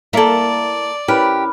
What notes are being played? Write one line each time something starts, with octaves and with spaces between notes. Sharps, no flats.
A#3 E4 A4 D5 A#5
C#4 E4 G4 A#4 B4